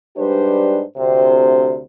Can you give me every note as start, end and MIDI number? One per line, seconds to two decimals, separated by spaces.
0.17 0.82 44
0.17 0.82 55
0.17 0.82 62
0.17 0.82 67
0.17 0.82 71
0.17 0.82 72
0.97 1.81 38
0.97 1.81 48
0.97 1.81 72